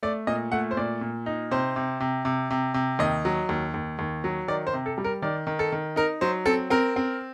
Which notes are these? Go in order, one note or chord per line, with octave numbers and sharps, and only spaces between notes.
A3 D5
A#2 D#5
A3 F#5
C5
A#2 D5
A#2
D#4
C3 C5
C3
C3
C3
C3
C3
D#2 D#5
F#3
D#2
D#2
D#2
F#3
D#3 D5
C5
C3
A4
G3
A#4
D#3 D5
D#3
A4
D#3
D#4 A#4
F#3 C5
C4 A4
C4 A#4
C4